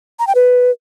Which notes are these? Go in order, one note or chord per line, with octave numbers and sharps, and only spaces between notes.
A#5
G5
B4